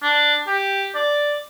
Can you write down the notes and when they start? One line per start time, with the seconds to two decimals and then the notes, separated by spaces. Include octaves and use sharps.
0.03 D4
0.47 G4
0.95 D5